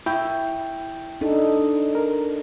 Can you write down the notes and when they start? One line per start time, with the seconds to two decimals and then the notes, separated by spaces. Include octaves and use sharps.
0.06 E4 G5 G6
1.21 D4 D#4 A4
1.95 A#4